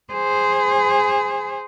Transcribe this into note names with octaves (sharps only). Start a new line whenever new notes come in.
G#4 C5